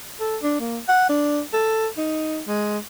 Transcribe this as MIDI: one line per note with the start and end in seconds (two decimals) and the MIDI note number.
0.20 0.37 69
0.42 0.58 62
0.60 0.78 58
0.88 1.05 78
1.09 1.41 62
1.53 1.87 69
1.97 2.40 63
2.48 2.78 56